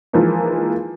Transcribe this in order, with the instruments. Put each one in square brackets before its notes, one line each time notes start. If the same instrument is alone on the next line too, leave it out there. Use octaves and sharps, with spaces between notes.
[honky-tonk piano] E3 F3 G#3 A#3 D#4